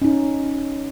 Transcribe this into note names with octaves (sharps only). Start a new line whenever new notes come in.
C#4 D#4